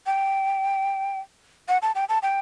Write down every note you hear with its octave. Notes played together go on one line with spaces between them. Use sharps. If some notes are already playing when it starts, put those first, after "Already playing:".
G5
F#5
A5
G5
A5
G5